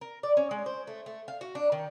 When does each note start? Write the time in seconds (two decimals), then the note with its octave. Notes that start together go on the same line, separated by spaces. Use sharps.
0.01 A#4
0.23 D5
0.37 C#4
0.51 G#3
0.66 C5
0.87 A3
1.06 A3
1.28 F5
1.41 F#4
1.55 D4
1.72 D#3